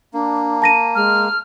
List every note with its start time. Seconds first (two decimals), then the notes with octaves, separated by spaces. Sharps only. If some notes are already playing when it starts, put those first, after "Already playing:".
0.14 A#3 D4
0.62 A5 A#6 D#7
0.95 G#3 F6